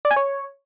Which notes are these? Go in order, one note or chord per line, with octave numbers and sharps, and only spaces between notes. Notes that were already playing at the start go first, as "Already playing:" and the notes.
D5
G#5
C#5